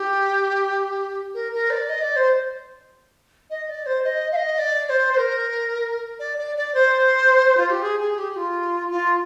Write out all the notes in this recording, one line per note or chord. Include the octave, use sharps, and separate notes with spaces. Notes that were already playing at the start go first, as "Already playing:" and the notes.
Already playing: G4
A#4
A#4
D5
D#5
D5
C5
D#5
D5
C5
D#5
F5
D#5
D5
D5
C5
C5
A#4
D5
D5
D5
C5
F4
G4
G#4
G#4
G4
F4
F4